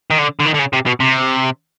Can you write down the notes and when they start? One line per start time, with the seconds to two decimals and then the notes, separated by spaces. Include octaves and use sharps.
0.11 D#3
0.18 D3
0.40 D3
0.46 D#3
0.54 D3
0.59 C#3
0.73 C3
0.86 B2
1.00 C3